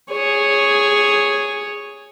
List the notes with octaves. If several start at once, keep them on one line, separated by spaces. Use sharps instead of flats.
G#4 C#5